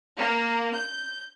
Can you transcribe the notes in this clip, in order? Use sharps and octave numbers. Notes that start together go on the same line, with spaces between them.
A#3
G6